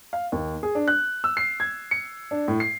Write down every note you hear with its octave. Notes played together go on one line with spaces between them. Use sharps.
F5
D#2
G#4
D4
F#6
E6
C7
G#6
C#7
D4
A2
C7